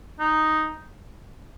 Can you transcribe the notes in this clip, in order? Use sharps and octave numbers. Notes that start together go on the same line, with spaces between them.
D#4